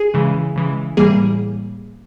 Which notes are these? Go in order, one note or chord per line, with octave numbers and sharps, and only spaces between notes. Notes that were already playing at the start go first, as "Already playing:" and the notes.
Already playing: G#4
C#3 E3 G#3
C#3 E3 G#3
A2 E3 G3 A#3 G#4